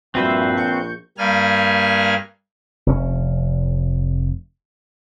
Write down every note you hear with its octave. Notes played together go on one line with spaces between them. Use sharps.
A#1 G2 C4 F#4 B4 C5 E5
C#6 G6
G2 G3 A#3 G#5 F6
F1 C#4